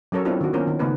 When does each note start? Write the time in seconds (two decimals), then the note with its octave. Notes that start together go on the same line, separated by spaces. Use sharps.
0.12 F#3 C#4 A4 A#4 C#5
0.25 B3 C4 D4 E4 F4 A4
0.41 D#3 F#4
0.53 A#3 B3 C#4 F4 A#4 C5
0.67 D#3
0.79 C#3 A3 B3 D#4 B4